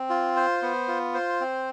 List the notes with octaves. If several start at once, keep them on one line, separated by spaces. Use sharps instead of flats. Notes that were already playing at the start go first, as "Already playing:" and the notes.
Already playing: C4
F4
C5
B3
F4
C5
C4